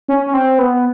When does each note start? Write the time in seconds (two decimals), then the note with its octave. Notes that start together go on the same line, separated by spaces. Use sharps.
0.08 C#4
0.27 C#4
0.34 C4
0.59 B3